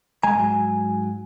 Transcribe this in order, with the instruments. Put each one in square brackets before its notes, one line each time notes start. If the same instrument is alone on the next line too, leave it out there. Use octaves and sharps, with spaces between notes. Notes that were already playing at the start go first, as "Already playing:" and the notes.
[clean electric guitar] B1 G#3 A#5 [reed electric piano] G#5
[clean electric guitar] G#2 F#3